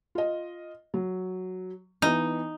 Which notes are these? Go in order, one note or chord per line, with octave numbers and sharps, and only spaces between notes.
F4 D#5
F#3
E3 B3 D#4